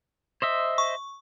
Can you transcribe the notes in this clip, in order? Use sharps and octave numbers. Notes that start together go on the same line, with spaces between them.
C5 D#5 E5
C#6